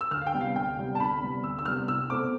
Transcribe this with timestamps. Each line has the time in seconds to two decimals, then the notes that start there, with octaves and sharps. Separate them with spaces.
0.01 E6
0.11 D2 F6
0.21 F5
0.26 G5
0.34 C3 G3 B3
0.41 F5
0.55 D2 G5
0.77 C3 G3 B3
0.95 A5
1.00 D2 B5
1.22 C3 G3 B3
1.44 D2 E6
1.59 E6
1.65 C3 G3 B3 F6
1.88 C2 E6
2.10 B2 A3 C4 D6